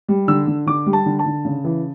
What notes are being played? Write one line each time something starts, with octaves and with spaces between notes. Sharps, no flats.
G3
D3 E6
D3
D3 D6
G3
A5
D3
A5
D3
C#3
E3